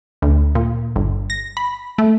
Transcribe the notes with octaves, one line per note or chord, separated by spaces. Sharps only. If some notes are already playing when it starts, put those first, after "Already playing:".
D2
A#2
G1
A#6
B5
A3